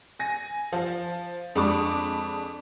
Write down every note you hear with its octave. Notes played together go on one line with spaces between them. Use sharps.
G#5 A#6
F3
F2 G#3 D4 B5 C#6 D6